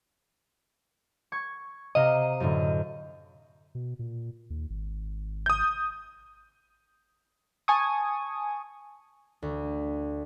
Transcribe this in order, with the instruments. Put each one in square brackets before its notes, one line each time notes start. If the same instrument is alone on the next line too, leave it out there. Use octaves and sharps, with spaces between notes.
[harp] C#6 G#6
[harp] C3 F5 A#5 [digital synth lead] D#5
[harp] F#2 A2 D3
[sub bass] B2
A#2
D#2
G#1
[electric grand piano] D#6 G6
[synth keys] G#5 A5 C#6 D#6
[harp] D2